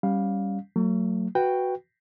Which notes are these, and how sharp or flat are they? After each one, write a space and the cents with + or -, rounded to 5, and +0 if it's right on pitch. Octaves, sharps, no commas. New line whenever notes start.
G3 +0 C#4 +0 F5 +15
F#3 +0 A3 +40
F#4 +0 B4 +0 G5 +5